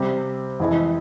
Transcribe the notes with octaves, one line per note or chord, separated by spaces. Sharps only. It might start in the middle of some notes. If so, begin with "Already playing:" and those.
Already playing: C3 G3 C4 G4
F2 E3 G#3 E4 G#4